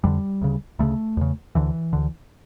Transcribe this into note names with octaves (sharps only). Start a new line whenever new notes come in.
F2 D3 G3
D2 C#3
D2 C#3 A3
E2 C#3
D2 D3 E3
D2 D3